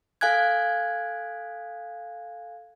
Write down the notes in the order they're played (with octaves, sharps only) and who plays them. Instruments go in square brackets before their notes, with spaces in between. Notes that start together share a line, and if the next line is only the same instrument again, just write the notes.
[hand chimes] A4 F5 G#5 F#6 G#6